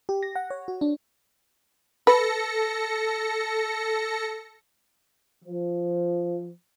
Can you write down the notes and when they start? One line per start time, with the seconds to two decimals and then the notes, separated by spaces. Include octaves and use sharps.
0.09 G4
0.23 A#6
0.35 F#5
0.50 C#5
0.68 F#4
0.81 D4
2.07 A4 B4 A#6 C#7
5.45 F3